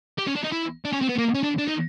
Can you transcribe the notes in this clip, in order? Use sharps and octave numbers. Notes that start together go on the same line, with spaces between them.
G4
C#4
D4
D#4
E4
D4
C#4
C4
B3
A#3
C#4
D4
D4
D#4